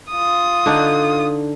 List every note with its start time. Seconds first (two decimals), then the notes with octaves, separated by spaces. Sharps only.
0.11 F4 D#6
0.66 D3 D4 D#4